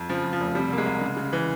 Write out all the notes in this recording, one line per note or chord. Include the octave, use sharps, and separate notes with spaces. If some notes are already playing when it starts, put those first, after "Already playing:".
Already playing: F2
C#3 F3
F2
F3
F1
C3 G3
C2 A#3
G#3
C2
C#3
C#3
E3